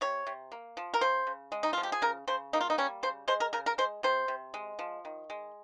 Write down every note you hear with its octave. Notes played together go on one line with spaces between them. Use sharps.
C3 C#5
C3
A#3
F3
A#4
C#3 C5
C#3
G#3
D#4
F3 F4
G4
G#4
C#3 A#4
C#3 C5
A#3 D#4
F4
D#4
G3 C#4
C#3 C5
G#3 C5
A#4
C#3 A#4
A#4
G#3 C5
C3 C5
C3
G#3
F3
D#3
G#3